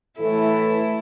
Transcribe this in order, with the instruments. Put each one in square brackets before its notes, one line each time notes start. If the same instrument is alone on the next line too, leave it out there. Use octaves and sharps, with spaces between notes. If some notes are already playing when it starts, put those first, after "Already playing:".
[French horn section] A2 E3 A4 [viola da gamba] A3 E4